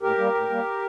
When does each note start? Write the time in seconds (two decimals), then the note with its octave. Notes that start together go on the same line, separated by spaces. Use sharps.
0.02 A2 G4 A#4
0.18 G3 A#3
0.35 A2
0.50 G3 A#3